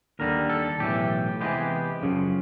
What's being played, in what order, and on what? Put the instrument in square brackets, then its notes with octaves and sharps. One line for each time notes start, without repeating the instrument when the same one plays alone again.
[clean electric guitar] D#2 D3 G3 A#4
A4
B1 A2 E3 G4
C3 E3 G#3 B3 G4
F#2 C#3 F3